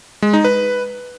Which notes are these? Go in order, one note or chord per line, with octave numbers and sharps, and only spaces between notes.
G#3
D#4
B4